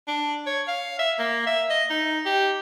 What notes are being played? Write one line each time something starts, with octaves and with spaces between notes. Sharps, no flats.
D4
C#5
F5
E5
A#3
E5
D#5
D#4
G4